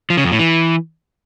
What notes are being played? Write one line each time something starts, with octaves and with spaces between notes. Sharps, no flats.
F3
C#3
F2
A2
E3